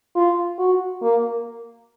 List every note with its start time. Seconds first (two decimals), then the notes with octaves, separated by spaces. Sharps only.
0.15 F4
0.59 F#4
1.02 A#3